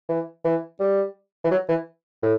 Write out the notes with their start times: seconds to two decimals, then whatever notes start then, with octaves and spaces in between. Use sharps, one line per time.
0.09 E3
0.45 E3
0.80 G3
1.44 E3
1.51 F#3
1.69 E3
2.23 A2